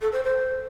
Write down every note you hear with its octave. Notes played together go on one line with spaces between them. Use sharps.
A4
C5
C5